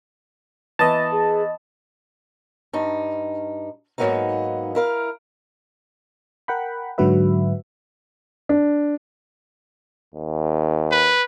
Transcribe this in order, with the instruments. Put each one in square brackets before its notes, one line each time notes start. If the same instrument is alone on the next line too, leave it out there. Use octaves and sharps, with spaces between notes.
[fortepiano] E3 B3 [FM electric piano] D#5 A5
[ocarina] G#4
[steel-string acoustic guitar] G2 D#4
G#2 C#3 F#3 A#3 B3 D#4
E4 A#4 F5
[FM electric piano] A#4 F#5 G5 B5
G#2 D3 F#3 F#4 B4 E5
[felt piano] D4
[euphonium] D#2
[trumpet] B4